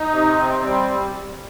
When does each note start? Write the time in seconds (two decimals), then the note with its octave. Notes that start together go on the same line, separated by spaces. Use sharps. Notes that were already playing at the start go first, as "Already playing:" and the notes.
Already playing: D#4
0.11 C3
0.38 C4
0.63 G3